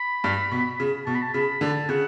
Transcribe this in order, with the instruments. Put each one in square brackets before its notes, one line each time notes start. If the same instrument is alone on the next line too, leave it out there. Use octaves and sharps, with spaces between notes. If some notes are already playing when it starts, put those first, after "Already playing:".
Already playing: [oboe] B5
[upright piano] G2
B2
C#3
[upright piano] B2 [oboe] A5
[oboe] B5
A5
[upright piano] C#3 [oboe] B5
[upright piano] D3 [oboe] A5
[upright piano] C#3 [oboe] F#5